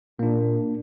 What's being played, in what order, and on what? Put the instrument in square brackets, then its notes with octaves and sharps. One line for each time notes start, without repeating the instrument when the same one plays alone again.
[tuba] A#2 [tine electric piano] A#3 D4